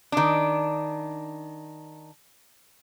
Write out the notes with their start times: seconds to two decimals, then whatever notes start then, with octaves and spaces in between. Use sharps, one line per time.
0.12 D#3 D4